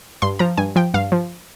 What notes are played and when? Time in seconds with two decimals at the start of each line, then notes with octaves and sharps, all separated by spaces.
0.22 G2 C6
0.39 F3 A#5
0.57 G2 G#5
0.76 F3 G5
0.94 G2 F5
1.12 F3